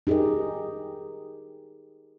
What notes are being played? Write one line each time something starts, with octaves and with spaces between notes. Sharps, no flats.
D#4 G4 G#4 A#4 D#5